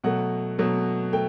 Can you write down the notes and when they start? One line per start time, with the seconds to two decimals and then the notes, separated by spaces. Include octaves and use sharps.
0.04 B2 F#3 A3 F#5
0.58 B2 F#3 A3
1.13 A3 G5